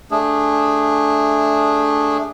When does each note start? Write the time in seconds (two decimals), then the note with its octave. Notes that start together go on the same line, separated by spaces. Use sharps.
0.11 A3 D4 G#4